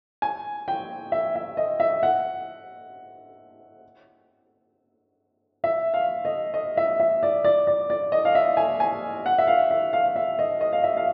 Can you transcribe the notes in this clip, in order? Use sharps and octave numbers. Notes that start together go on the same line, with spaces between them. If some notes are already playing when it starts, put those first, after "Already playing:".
G#5
G5
E5
E5
D#5
E5
F#5
E5
F5
D#5
D#5
E5
E5
D5
D5
D5
D5
D#5
F5
E5
G#5
G#5
F#5
E5
F5
E5
F5
E5
D#5
D#5
F5
E5
F5